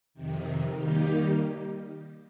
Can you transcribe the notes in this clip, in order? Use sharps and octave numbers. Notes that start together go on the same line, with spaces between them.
F2 C3 D#3
D#3 G3 A#3 D#4 G4